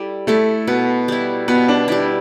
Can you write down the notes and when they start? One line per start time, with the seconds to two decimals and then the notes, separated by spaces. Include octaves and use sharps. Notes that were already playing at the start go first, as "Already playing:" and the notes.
Already playing: G3 E4 A4
0.27 A3 E4 A4
0.67 B2 B3
1.08 G3 E4
1.48 B2 B3
1.68 D4
1.88 G3 D4 E4